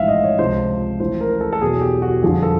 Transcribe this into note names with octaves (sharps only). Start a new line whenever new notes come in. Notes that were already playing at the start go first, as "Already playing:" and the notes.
Already playing: A1 G#2 F3 E5 F5
D#5
C#5
C#2 C3 F3 C5
A1 A2 F3 C5
A#4
A4
A4
E2 B2 F#3 G#4
G4
F#4
G1 F2 D3 F3 G#4
A4